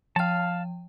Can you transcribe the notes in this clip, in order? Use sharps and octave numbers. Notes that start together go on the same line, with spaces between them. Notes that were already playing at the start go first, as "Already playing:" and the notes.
F3 F5 G5 A5